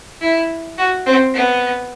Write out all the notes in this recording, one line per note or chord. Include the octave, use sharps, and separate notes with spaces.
E4
F#4
C4
B3